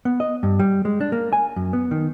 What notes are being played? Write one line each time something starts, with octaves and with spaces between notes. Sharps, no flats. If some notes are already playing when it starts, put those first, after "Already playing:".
B3
D#5
G2
G3
G#3
D4
A#3
G#5
F#2
B3
D#3